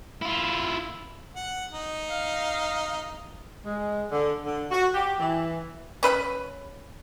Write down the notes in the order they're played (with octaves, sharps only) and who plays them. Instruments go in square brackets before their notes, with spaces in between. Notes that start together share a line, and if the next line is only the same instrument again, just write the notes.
[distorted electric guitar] E4 F4
[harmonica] F#5
D#4
[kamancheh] F5
[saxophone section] G#3
D3
D3
F#4
G4
E3
[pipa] C#4 B4 E5 B5